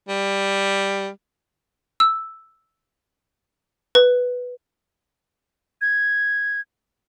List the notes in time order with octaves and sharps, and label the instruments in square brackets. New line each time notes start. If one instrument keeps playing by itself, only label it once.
[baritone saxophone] G3
[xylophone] E6
B4
[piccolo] G#6